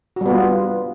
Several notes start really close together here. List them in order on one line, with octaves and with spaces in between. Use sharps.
F#4 G3 B3 F4